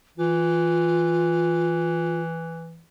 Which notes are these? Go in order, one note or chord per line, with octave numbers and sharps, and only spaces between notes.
E3 F4